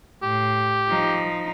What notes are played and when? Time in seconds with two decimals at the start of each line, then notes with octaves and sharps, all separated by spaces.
0.22 A2 G4
0.88 F3 D#4